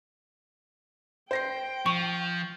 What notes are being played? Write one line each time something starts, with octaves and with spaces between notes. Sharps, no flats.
C5 G5 A#6 C7
F3 C#6